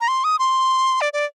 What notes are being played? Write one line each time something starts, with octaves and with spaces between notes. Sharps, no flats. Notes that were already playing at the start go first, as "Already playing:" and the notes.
A#5
C6
D#6
C6
D5
D5